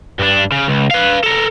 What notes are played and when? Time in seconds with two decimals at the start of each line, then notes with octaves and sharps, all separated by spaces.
0.19 G2 D4
0.52 C#3
0.68 C#2
0.91 B4 F5
1.24 A4 A#4